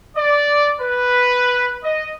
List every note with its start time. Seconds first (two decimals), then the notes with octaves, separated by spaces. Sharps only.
0.17 D5
0.81 B4
1.83 D#5